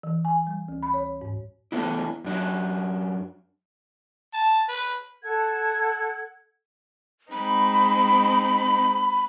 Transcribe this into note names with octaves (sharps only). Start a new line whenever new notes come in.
E3
G#5
G3
D2
B5
C#5
G#2
E2 D#3 A3 B3 D4 E4
F#2 D4 F#4
A5
B4
A4 F#5 G#6
G#3 C4 D#4 B5